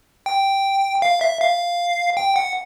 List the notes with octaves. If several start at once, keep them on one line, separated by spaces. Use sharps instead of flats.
G5
F5
E5
F5
G5
F#5